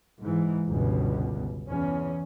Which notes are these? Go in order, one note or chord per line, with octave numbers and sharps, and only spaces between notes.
G#2 E3
G1 C#2 B2
E2 C#4